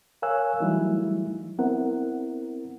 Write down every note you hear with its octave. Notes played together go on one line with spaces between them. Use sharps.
A#4 C#5 F5 G#5 E6 F#6
E3 F#3 G3 A3 D#4 E4
B3 C4 E4 A#4 F#5